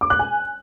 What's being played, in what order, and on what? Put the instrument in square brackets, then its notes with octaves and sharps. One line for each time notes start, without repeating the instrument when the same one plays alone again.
[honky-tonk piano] D6
F#6
G#5